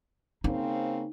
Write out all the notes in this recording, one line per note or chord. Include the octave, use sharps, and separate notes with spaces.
C#3 A#3 C4 D#4